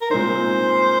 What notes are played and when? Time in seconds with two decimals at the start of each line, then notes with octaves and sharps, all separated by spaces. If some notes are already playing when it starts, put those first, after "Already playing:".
0.01 A#4
0.10 A#2 G#3 C4 D#4 C5